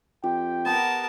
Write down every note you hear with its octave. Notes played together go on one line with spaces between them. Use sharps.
F2 G4 G5
B3 A#4 A5